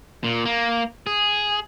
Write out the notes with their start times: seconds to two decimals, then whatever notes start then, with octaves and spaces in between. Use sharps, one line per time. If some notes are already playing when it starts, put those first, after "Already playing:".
0.24 A#2
0.45 A#3
1.07 G#4